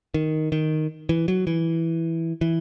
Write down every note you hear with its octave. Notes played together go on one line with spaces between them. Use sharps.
D#3
D#3
E3
F#3
E3
E3